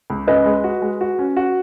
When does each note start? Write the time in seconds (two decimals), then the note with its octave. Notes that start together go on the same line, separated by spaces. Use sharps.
0.10 C#2
0.27 C#4 B4 D#5
0.46 G#3
0.64 F#4
0.82 G#3
1.01 F#4
1.19 C#4
1.37 F#4